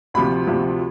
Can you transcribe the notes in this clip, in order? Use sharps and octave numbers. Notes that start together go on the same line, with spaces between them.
D2 C3 F3 B5
D2 C3 F3